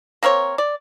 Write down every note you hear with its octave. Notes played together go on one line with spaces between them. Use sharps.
A#3 C4 A#4 C#5
D5